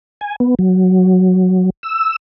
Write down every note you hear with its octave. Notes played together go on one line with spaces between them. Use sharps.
G#5
B3
F#3
E6